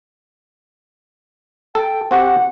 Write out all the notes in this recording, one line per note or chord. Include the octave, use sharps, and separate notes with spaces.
A4 G5
C4 F#4 G4 F#5